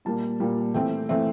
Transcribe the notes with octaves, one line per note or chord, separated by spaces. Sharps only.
A#2 G3 A#3 A5
A#2 G3 A#3
E3 A3 C4 G5
E3 A3 C4 E5